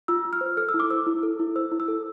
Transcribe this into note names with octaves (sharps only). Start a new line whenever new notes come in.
F4 E6
F4
F6
C5
A4 F6
E6
E4
D6
C5 E6
E4
A4
E4
C5 E6
E4
E6
A4